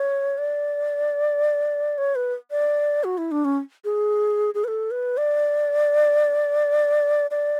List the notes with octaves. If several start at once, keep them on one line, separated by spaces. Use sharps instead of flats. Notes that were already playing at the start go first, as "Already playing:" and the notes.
Already playing: C#5
D5
C#5
B4
D5
F#4
E4
D4
C#4
G#4
G#4
B4
A4
B4
D5
D5